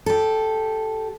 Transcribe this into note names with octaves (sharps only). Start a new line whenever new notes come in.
G4 A4